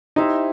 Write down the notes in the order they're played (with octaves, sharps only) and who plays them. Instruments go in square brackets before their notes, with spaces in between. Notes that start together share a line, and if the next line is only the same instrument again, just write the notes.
[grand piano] D#4 [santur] E4 G4 C5 E5